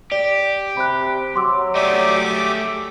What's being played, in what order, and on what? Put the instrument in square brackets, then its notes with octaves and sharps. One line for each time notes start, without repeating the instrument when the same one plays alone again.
[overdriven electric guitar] G4 [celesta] D5
[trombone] C3 [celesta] B5 F#6
[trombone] F#3 [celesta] C6 D6 E6
[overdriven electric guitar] A3 G#4 [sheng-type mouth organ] G4 E5 D6 [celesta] D5